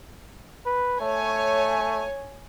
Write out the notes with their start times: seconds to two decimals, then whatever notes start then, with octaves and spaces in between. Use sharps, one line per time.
0.66 B4
1.01 A3 C#5 G#5